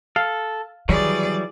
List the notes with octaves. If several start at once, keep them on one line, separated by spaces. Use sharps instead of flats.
A4 F5
D#3 E3 F#3 G3 G#4 D5